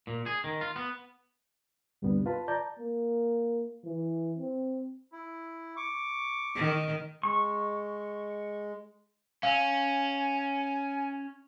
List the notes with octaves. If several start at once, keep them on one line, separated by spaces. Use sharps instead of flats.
A#2
G#4
D#3
F4
B3
D2 G2 C3 G3 B3 D4
F4 B4 A5 B5
D5 A5 A#5 G6
A#3
E3
C4
E4
C#6 D6
D#3
G#3 C#6
C#4 F5 G#5